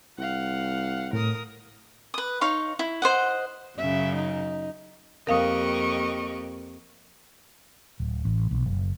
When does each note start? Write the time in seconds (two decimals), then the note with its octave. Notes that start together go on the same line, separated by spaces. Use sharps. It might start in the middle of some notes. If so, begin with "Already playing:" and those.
0.18 C2 F5 F#5
1.13 A2 A#4 D#6
2.14 B4 D#6
2.41 D#4 C#5 F5 C6
2.79 E4
3.02 C5 D#5 F#5
3.78 F#2 C#3 E5
4.16 D#4
5.27 F2 A#3 G4 A#4 D#5 F5 C#6 D#6
8.00 D1
8.25 A1
8.51 B1
8.66 F#1